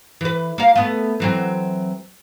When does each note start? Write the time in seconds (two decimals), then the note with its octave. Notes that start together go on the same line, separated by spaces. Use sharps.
0.21 E3 B4
0.58 A#3 F5
0.76 A3 B3
1.20 E3 F#3 C4